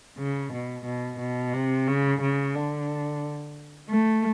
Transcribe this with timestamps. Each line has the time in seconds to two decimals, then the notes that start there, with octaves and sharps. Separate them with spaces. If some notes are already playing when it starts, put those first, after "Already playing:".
0.18 C#3
0.52 B2
0.85 B2
1.19 B2
1.54 C3
1.87 C#3
2.21 C#3
2.55 D3
3.90 A3